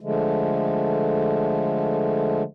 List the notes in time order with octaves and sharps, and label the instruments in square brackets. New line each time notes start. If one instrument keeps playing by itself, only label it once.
[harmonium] D3 F3 G#3 A3